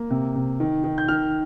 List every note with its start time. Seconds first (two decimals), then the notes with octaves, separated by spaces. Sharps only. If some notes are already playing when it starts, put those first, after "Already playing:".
Already playing: A#3
0.10 C3
0.36 C3
0.60 D#3
0.84 D#3
0.98 G6
1.08 D#3 F6